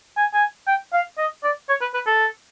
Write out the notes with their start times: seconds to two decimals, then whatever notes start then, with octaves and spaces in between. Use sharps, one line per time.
0.17 G#5
0.34 G#5
0.67 G5
0.93 F5
1.18 D#5
1.43 D5
1.69 C#5
1.81 B4
1.94 B4
2.07 A4